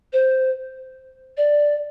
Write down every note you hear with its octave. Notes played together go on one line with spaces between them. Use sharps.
C5
D5